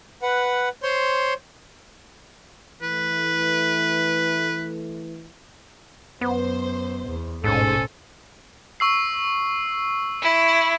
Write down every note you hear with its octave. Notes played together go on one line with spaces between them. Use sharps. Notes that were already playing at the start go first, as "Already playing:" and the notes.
B4 F#5
C5 C#5 C6
E3 A3 B4
F#2 B3 C5
E2
A1 G#2 B2 C#4 A4 C5 G#5
C#6 E6 C7
E4